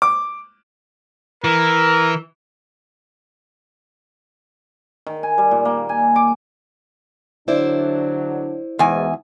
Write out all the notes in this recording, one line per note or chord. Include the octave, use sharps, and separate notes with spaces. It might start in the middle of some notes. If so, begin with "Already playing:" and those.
D6
E3 A#4
D#3
G#5
G3
A#2
A#3
G#5
D6
D3 F#3 D4 E4 C5 D5
E2 G#2 B2 G#5